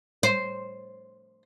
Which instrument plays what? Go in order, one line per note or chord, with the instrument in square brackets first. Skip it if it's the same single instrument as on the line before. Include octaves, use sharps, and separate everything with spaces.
[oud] C5